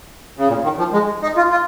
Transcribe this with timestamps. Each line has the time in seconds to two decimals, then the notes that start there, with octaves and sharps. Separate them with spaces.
0.37 C#3
0.48 A#2
0.64 D#3
0.78 F3
0.93 G#3
1.23 D#4
1.37 F4
1.51 F4